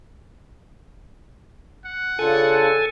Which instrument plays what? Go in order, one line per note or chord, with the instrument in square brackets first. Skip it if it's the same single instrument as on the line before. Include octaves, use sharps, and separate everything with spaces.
[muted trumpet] F#5
[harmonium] C#3 D4 F4 [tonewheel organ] A4 G#5